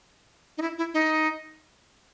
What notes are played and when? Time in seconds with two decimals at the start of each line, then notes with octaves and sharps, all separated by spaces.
0.58 D#4
0.62 E4
0.78 E4
0.94 D#4